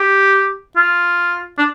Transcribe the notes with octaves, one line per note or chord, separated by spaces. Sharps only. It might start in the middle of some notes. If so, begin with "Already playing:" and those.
Already playing: G4
F4
D4